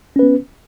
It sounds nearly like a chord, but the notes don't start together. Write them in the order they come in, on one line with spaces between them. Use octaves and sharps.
C#4 B4 B3